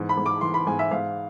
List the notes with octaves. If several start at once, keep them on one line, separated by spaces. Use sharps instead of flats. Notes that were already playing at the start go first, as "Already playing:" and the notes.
Already playing: G#2 E3
B5
G#2
D6
E3 C6
B5
G#2 G#5
E5
G#2 F5